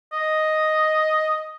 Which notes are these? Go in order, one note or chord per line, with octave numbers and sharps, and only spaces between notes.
D#5